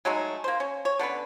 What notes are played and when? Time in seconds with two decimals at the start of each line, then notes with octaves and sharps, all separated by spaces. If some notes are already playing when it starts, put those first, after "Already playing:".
0.05 F#3 G#3 A3 D#4
0.44 A#3 C5
0.60 C#4
0.85 C#5
0.99 D3 B3 C#4 B4